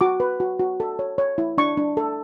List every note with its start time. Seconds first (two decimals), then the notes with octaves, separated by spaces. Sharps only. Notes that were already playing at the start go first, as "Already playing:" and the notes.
0.01 F#4 D6
0.20 B4
0.40 F#4
0.59 F#4
0.80 A4
0.99 C#5
1.18 C#5
1.38 E4
1.58 D4 C#6
1.77 D4
1.97 A4